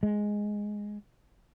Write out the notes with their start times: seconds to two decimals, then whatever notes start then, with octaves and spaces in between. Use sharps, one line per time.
0.03 G#3